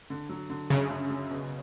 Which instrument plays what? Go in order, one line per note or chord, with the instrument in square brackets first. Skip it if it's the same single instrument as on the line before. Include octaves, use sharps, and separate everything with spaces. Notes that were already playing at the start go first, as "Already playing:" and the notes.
[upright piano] D3
F#3
D3
[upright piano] F#2 [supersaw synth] C#3
[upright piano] F#2
F#3
B2